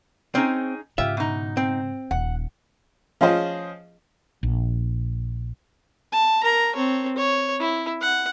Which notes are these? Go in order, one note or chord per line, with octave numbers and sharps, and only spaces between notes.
C4 C#4 D#4 G#4
G#2 C#3 F4 G4 E5
B2 D#4
C4
D#1 F#5
F3 C#4 F4 G#4 C5 D#5
A#1
A5
A#4 A#5
C4 C#5
C#5
E4
F#5